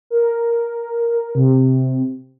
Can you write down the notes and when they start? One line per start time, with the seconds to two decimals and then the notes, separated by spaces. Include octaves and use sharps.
0.10 A#4
1.35 C3